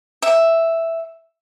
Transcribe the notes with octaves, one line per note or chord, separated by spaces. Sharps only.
E5